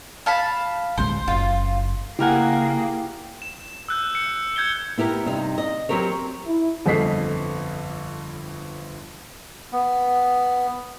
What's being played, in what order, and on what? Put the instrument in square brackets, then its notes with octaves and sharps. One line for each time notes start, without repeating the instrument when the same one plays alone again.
[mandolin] F5 A5 B5
[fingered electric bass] A1 D2 G#3 [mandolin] C5
[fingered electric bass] F#1 [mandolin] F4
[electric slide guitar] C#3 G#5 [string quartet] A#3 G#4 [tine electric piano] E4 [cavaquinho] G4 A#4 F#5
[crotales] E7
E6 F#6 G6
C#7
G6 G#6 C#7 G7
[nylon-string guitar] B3 E4 G4 A#4
G2 C3 D#4
D#5
F#3 C4 G4 A#4 C#5
[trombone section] E4
[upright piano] G1 F2 A4 D#5 B6 C7
[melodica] B3